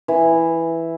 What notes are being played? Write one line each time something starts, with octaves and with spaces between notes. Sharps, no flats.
E3